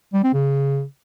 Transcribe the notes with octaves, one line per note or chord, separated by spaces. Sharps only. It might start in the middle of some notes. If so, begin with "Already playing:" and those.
G3
C4
C#3